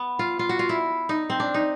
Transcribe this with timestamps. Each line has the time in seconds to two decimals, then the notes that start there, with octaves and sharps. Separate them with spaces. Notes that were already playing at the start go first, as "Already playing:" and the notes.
Already playing: B3
0.19 F4
0.39 F4
0.49 F#4
0.59 F4
0.69 E4
1.09 D#4
1.30 C4
1.40 D4
1.54 D#4